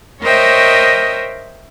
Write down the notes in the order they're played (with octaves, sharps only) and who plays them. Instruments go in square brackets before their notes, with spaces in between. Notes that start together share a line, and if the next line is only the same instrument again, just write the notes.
[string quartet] A#4 C5 C#5 D#5 E5 G5